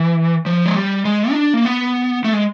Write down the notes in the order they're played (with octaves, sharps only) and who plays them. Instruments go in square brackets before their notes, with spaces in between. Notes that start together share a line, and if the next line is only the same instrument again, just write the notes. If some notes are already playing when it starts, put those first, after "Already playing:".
Already playing: [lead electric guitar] E3
F3
G#3
G3
G#3
D#4
D4
A#3
B3
A3
G#3